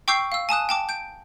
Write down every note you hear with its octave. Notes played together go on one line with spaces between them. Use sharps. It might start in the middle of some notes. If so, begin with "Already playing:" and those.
G5 C#6 D6 E6 G6 C7
F5 E6
G#5 A5 D#6 F#6
G5 A5 D6
G6 D7